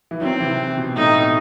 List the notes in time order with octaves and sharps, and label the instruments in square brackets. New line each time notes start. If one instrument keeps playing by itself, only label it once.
[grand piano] E3
[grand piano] D#3 F#3 [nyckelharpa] C4
[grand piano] C3 E3
B2
[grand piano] A2 [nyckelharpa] D#4
[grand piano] B2